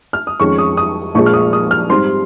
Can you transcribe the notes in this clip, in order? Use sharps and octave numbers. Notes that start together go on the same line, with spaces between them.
F6
D#6
F2 D#3 G#3 C#4 C#6
D#6
D#6
A#1 A#2 F3 G#3 C#6
F6
D#6
D#6
F6
G#2 G3 C4 C6